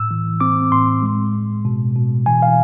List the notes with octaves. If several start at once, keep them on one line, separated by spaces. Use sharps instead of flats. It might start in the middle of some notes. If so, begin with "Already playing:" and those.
Already playing: A2 E6
E3
C4 D6
A2 C6
G#3
G#3
B2
B2
E3 G#5
F5